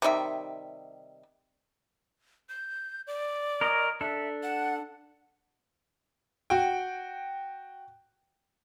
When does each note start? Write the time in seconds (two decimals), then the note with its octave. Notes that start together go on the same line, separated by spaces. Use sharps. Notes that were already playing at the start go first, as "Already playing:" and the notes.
0.02 C3 D#3 G3 E5
2.49 G6
3.07 D5
3.61 A#4 C#5 D#5
4.01 D4 A4 E5
4.43 F#5
6.50 F#4 G5